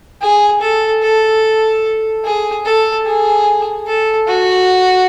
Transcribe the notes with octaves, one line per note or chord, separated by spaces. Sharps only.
G#4
A4
A4
G#4
A4
G#4
A4
F#4